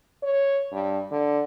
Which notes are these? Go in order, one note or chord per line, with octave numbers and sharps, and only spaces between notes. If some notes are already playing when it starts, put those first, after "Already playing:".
C#5
G2
D3